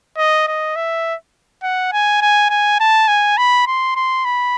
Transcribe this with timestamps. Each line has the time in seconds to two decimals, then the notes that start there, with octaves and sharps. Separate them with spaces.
0.18 D#5
0.48 D#5
0.76 E5
1.63 F#5
1.93 G#5
2.22 G#5
2.50 G#5
2.80 A5
3.08 G#5
3.38 B5
3.67 C6
3.96 C6
4.25 B5